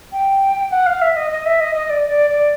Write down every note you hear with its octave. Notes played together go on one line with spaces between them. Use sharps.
G5
F#5
F5
E5
D#5
D#5
E5
D#5
D#5
D5
D5
D5